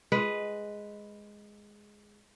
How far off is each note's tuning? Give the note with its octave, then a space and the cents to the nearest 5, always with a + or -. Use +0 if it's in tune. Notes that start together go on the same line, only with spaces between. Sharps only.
G#3 +0 B4 +0